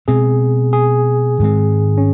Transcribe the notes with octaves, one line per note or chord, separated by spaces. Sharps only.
B2 G#3 C4 G#4
G#4
G#2 D#3 G#3 C4
C#4